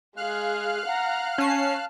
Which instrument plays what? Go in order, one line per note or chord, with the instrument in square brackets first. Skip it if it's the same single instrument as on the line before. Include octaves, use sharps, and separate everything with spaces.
[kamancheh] G#3 G#4 [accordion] F5 F6 F#6
[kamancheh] F#5 A#5
[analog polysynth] C#4 C7 [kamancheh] A5